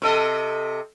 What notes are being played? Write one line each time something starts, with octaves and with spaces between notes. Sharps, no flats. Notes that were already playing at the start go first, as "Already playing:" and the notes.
C3 A4 D#5